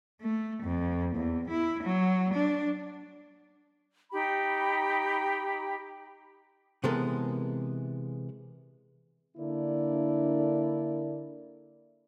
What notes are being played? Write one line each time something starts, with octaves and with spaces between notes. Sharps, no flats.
A3
F2
E2
E4
F#3
D4
D#4 G4 G5 B5
C3 E3 G#3 B3 A4 A#4
D3 A#3 D4 E4 A#4 D5